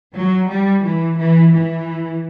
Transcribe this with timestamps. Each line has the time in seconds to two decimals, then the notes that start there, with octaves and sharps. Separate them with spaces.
0.14 F#3
0.48 G3
0.83 E3
1.17 E3
1.52 E3